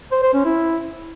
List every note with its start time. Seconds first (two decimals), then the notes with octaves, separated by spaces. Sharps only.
0.11 C5
0.23 C5
0.34 C#4
0.45 E4